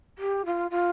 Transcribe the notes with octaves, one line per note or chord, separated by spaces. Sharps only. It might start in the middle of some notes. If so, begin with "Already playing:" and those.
G4
F4
F4